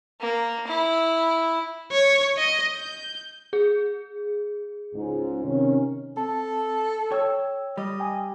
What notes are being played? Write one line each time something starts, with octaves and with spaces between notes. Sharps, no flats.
A#3
E4
C#5
D#5
G6
G#4
C#2 G#2
C3 D#3 C#4
C4 A4 A5
C#5 G5 E6
G3 D#5
G5 G#5 D#6